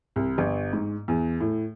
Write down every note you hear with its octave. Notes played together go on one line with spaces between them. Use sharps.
C2
G1
G#2
E2
A2